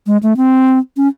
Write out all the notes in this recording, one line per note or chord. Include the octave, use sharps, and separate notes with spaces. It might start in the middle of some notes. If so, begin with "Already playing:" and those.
G#3
A3
C4
C#4